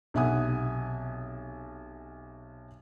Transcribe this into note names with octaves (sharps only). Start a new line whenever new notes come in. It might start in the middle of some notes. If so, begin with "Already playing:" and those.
B1 C3 E5 F#5 G#5 D#6